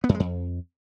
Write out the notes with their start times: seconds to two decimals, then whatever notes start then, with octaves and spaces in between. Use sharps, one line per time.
0.04 B3
0.09 F#2
0.14 G#3
0.20 F2